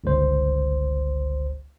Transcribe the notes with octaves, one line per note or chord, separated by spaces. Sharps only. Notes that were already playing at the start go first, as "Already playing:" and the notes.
G1 C#2 C5